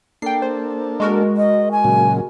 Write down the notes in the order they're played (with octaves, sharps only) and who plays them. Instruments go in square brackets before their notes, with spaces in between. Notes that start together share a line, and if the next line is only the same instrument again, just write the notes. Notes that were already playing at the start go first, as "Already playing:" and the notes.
[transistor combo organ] A#3 D4 A4 [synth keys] G5 C7
[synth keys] C5
G#3 F#4 A#4
[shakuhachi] D#5
G#5
[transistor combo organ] A#2 C#3 F#3